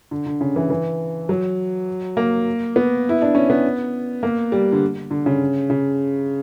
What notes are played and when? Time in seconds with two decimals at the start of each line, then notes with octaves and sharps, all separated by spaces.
0.11 D3
0.26 D3
0.41 C#3
0.56 E3
0.70 E3
1.29 F#3
2.17 A#3
2.76 B3
3.09 E4
3.22 D4
3.35 C#4
3.50 B3
4.23 A#3
4.52 G3
4.72 D3
5.11 D3
5.26 C#3
5.70 C#3